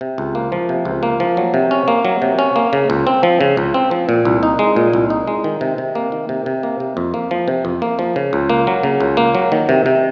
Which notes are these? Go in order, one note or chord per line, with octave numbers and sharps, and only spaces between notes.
C3
C#2
A#3
F3
C3
C#2
A#3
F3
F#3
C3
C#4
A#3
F#3
C3
C#4
A#3
C#3
C#2
C4
F3
C#3
C#2
C4
F3
A#2
C2
D#4
G#3
A#2
C2
D#4
G#3
D#3
C3
C3
A#3
D#3
C3
C3
A#3
C3
F2
A#3
F3
C3
F2
A#3
F3
C#3
C#2
A#3
F#3
C#3
C#2
A#3
F#3
D#3
C3
C3